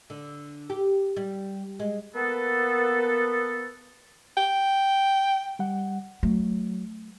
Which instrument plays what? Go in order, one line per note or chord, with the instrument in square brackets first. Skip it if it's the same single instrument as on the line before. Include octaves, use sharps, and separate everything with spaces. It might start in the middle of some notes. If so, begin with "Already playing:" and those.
[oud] D3
G4
G3
G#3
[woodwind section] A#3 B3 A4 B4
[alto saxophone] G5
[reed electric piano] G3 F#5
[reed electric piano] F#3 [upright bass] A3